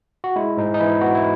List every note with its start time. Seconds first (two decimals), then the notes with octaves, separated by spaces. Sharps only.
0.24 F#4
0.36 G#3 E4
0.57 G#2 D#4
0.74 D#4
0.80 E3 E4
1.01 B3 F#4
1.15 E4